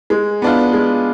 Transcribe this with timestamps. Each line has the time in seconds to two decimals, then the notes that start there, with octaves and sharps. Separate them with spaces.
0.10 G#3
0.42 B3 D4 F4
0.73 G#3